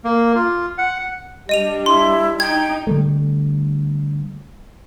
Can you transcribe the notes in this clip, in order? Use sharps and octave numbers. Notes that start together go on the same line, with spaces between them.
A#3
F4
F#5
G3 D4 D#5 D#7 F7
E4 C6
D#4 G5 G#6
D3 G3 A3